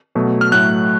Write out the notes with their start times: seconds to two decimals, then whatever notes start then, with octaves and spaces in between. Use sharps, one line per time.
0.15 B2 F#3 A3
0.41 F6
0.52 A2 F#3 A3 F#6